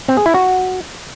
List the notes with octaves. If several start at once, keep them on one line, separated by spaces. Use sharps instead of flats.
C4
G#4
E4
F#4